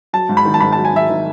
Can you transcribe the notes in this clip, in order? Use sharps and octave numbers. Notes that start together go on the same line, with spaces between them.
F#3 A5
G#2
B5
D#3
A5
G#2 B5
A5
F#3
G#5
G#2 E5
D#3